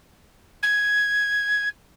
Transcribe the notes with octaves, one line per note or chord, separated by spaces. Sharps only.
G#6